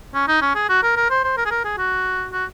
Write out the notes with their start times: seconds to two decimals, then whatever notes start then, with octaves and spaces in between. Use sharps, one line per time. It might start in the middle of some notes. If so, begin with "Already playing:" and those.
0.14 C#4
0.28 D#4
0.42 C#4
0.55 G#4
0.69 F#4
0.83 A#4
0.96 A#4
1.10 C5
1.24 C5
1.37 A#4
1.46 G#4
1.51 A#4
1.64 G#4
1.78 F#4
2.32 F#4